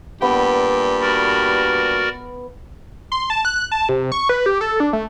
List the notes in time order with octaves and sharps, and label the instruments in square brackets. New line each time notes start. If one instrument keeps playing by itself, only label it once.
[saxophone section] G2 A#2 G4 [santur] B3
[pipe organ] F#4 A#4 D5
[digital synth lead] C6
A5
F#6
A5
C3
C#6
B4
G4
A4
D4
A3